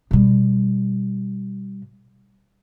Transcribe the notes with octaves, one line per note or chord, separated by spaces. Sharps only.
B2 G3